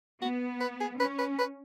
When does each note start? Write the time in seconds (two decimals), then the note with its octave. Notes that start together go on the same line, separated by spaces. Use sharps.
0.22 B3 F#4
0.60 B4
0.80 G#4
1.00 C#4 B4
1.19 B4
1.38 B4